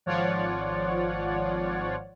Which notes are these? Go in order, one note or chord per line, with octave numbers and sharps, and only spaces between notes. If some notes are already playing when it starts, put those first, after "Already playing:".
G#1 F3 F4 C#5 D5 F#5